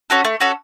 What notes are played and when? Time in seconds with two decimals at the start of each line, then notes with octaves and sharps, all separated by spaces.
0.10 C#4 F#4 A4
0.25 A3
0.40 C#4 F#4 A4